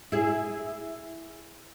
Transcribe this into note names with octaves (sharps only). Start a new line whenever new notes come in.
E4 G#4